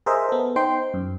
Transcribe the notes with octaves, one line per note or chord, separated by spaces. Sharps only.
G#4 A#4 C5 D#5 E5
B3 A4
D#4 C5 G5 C6
F#2